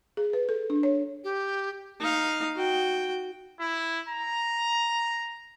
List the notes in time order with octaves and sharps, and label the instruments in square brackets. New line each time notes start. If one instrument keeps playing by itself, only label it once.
[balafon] G#4
B4
A4
D4
C#5
[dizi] G4
[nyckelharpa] D#4 F5
F#4 G5
[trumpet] E4
A#5